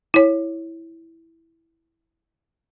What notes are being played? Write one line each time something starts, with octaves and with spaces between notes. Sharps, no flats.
E4 C#5